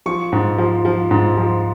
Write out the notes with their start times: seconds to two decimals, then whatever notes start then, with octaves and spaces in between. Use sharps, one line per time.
0.06 F3 C#6
0.32 G#2
0.58 F3
0.85 F3
1.11 G#2
1.37 F3